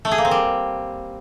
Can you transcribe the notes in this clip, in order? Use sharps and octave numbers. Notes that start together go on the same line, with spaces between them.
A3
G#4
A#3
C4
G3